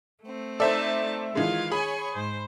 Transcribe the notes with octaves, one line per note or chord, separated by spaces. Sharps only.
A3 C4
D#4 A4 C5 D5 E5 A5
D#3 E3 G#3 F4 F5
G#4 C#5 G#5 B5 C#6
G#2 C5